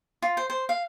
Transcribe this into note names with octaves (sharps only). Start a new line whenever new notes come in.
F4
C5
C5
F5